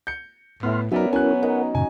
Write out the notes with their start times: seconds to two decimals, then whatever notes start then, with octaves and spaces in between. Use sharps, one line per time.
0.07 G6 C#7
0.63 A2 B3 E5 C6 F6
0.92 F#3 B3 C#4 D#4 F#4 A#4 D5 E5
1.13 F#3 C#4 E4 A#4 G#5 F#6
1.43 D#4 A#4 F#5
1.75 F#2 A#2 C#3 G#5